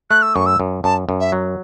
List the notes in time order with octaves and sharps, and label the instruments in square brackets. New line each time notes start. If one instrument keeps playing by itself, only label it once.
[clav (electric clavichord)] A3 [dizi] F#6
[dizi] E6
[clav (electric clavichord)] F#2 [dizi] C#6
[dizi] E6
[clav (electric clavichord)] F#2
[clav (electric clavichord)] F#2 [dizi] A5
[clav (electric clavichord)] F#2
[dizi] E5
[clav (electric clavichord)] F#3